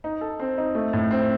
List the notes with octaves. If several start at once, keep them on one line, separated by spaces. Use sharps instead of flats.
D#4
A4
C4
D#4
A3
A2
C4